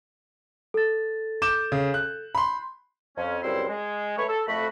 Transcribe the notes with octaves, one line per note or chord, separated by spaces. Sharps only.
A4 A6
D6 G6 E7
C#3
F#6
B5 C6
F2 C#4
C#2 F#2 G3 C4 E4 C6
G#3
A3 B4 C#5
A4
F2 A3 F#4 B5